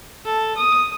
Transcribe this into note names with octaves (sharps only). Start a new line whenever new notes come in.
A4
D#6